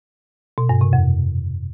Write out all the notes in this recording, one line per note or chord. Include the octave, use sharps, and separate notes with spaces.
B2
G2
C3
F2